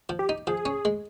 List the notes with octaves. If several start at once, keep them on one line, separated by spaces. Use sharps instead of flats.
F3
G4
D#4
F3 G#4
C#4
G#3